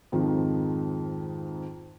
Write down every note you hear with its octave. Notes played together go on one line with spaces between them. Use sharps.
F2 G#2 D#3 F3